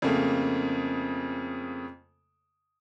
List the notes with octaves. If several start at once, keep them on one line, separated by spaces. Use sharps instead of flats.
F2 C#3 A3 A#3